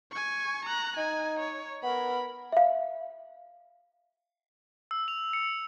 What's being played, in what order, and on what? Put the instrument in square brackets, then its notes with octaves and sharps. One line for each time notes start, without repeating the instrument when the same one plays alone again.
[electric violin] G#5 C#6
A#5 F#6
[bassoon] D#4 [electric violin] G#5
[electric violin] C#5
[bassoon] B3 [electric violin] A#4 B5
[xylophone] E5 F5
[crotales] E6
F7
C#7